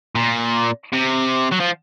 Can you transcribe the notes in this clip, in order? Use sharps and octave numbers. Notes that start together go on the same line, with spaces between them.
A#2
C3
F#3
F3